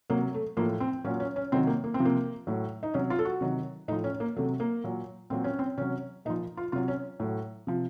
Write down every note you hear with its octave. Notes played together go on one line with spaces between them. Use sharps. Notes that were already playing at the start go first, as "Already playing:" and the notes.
C3 F#3 A#3
A3
A2 F3 A#3
C4
A#2 F#3 C#4
C#4
C#4
C3 D#3 F#3 C4
A#3
A#3
C4
C3 F3
A#3
A2 F#3
D#4
C3 F#3 C#4
F4
A4
F#4
C3 D#3 F#3
A2 F3 D#4
C#4
A#3
C3 F#3 A3
A#3
A#2 F#3
A#2 F#3 C4
C#4
C4
C3 F#3 C#4
A#2 F3 D#4
F4
C3 F#3 F4
C#4
A2 F#3
C3 F3